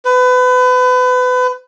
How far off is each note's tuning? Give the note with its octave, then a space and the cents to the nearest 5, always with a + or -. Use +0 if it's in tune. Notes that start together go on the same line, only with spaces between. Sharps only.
B4 +30